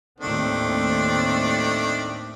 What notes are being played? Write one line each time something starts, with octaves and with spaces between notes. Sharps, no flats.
D#2 A2 D#3 A3 C4 D4